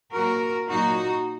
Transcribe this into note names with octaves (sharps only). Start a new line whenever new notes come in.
A#2 F#3 A#3 F#4 A#4
A#2 F#3 A#3 D#4 F#4